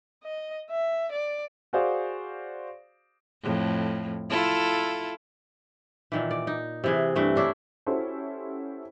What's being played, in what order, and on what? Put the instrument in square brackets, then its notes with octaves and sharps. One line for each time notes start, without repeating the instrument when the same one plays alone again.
[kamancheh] D#5
E5
D5
[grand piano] F#4 G#4 C5 D5 F5
[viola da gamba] F2 A2
E4 F4 A4
[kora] A#2 D#3 E3
D5
D#4
C3 E3 G#4
G2 E3 A3
C#4 D4 E4
[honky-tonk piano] C#4 E4 F#4 G4 A4 C5